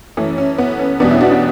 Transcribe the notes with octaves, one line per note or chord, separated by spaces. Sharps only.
F#2 E3 A3 C#4
C#4
B3
C#4
E2 B2 G3 B3 D4
C#4 E4
D4 F#4
D4 F#4